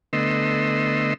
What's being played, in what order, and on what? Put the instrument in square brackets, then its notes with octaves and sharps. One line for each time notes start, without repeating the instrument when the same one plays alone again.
[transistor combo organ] D3 A3 B3 D#5 C6 E6